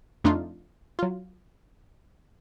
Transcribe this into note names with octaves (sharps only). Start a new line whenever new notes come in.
F2 A3 D4 D#4 F4
F#3 F4